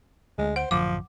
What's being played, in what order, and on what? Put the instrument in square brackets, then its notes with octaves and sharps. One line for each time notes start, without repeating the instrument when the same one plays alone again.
[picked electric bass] D2 [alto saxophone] G#3
[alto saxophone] C5 [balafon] F#5
[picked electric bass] A1 F#2 D3 [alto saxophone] F3 [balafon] D6